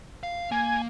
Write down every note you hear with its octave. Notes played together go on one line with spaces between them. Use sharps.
F5
A#3 G#5